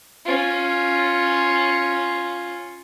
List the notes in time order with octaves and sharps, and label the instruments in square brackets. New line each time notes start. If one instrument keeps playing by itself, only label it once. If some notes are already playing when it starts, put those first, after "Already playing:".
[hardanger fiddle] C#4 F4